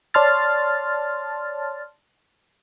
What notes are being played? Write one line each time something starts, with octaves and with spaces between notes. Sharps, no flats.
C#5 D5 A5 C6 F6 A6